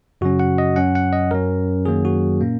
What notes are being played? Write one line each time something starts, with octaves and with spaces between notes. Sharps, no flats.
F#2 C#3 F#3 C#4 F#4
F#5
D#5
F#2 F#3 C#4 F#5
F#5
D#5
F#2 F#3 C#4 A#4
F#2 D#3 F#3 A#3 G#4
F#4
A#2 A#3 C#4